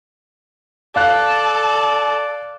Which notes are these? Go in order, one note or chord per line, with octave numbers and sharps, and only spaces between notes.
A4 D5 F5 F#6